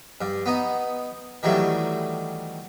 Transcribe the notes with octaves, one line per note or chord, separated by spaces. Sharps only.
G2
B3 D#4
D#3 E3 F#3 G3 A3